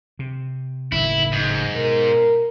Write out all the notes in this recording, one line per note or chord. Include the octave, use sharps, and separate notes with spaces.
C3
F#1 A2 D#3 E4
G#2
B2 A#4